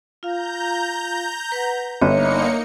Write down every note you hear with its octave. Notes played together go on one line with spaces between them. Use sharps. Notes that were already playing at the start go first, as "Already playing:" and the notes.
F4 F5 A#5 G6
B4 F#5
G1 A#3 D#4 C#5 D#5 E5 C#7